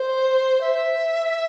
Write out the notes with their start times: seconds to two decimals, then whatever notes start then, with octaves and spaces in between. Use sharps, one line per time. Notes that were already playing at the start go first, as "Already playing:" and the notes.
Already playing: C5
0.61 E5